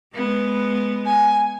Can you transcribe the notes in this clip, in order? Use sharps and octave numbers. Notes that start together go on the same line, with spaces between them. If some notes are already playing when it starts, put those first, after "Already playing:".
G#3 B3
G#5